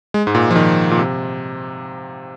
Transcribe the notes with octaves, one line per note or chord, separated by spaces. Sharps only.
G#3
G#2
A#2
F3
D#3
A#2
C3